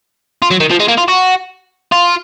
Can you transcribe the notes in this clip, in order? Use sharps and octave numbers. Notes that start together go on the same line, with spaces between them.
F4
F#3
D#3
F3
G#3
A#3
F4
F#4
F4